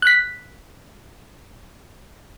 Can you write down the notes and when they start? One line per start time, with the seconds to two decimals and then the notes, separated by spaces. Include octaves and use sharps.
0.02 F#6 B6